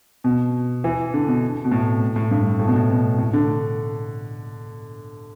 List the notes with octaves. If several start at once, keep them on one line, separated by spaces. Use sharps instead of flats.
B2
E3
D3
B2
B2
A2
A2
G2
A2
B2
A2
B2
A2
D3